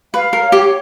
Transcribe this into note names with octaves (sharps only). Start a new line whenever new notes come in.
B4 F5
A#4
C#5
G4